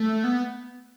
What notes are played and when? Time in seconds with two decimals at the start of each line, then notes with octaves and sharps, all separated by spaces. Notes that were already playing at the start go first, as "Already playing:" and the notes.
Already playing: A3
0.24 B3